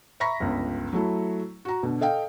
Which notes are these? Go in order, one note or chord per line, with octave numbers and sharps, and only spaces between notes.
E5 A#5 B5 C#6 A#6 B6
G1 C#2
F#3 A3 E4
F#4 A#5
B2 D3
A4 D#5 F5 G5